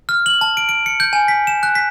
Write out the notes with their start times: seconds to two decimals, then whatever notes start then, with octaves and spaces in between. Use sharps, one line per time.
0.09 F6
0.26 F#7
0.41 A5
0.57 D7
0.69 D7
0.86 C#7
1.00 G6
1.13 G#5
1.28 B6
1.47 E7
1.63 F#6
1.75 B6